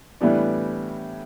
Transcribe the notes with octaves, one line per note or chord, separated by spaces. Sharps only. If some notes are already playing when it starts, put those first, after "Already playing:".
A2 E3 G3 B3 D4